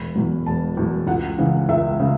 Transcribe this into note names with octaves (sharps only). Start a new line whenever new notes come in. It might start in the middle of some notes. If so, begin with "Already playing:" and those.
Already playing: E1 B5
E2 B2 F#3
E1 A5
E2 B2 F#3
C#2 F#5
C#3 E3
C#2 E5
C#3